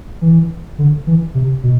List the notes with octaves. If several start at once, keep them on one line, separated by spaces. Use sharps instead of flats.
E3
D3
E3
C3
B2